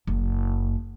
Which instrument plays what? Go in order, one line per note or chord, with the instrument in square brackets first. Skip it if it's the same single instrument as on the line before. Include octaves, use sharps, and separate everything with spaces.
[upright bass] F#1